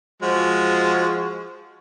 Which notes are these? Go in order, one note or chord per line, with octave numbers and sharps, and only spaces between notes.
F3 G#3 F#4